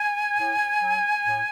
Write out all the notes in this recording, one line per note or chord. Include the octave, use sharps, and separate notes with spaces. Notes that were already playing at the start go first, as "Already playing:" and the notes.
Already playing: G#5
A2
F#3
A2